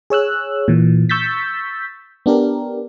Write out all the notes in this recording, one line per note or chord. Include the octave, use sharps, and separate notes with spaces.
G#4 C#5 E6 F#6
A#2 E3
C#6 E6 G6 A6 B6
B3 D4 G4 A#4